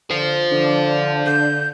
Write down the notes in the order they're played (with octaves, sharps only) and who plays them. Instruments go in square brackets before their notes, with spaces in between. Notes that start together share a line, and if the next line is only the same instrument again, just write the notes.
[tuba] D3 [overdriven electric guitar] C5 F5
[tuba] D3 [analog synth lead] D4
[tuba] D3 [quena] G6